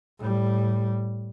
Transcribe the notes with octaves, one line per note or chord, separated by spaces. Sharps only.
A2 G3